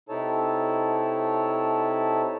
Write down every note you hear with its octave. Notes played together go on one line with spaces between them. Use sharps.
C3 D#4 E4 A4 C#5 A5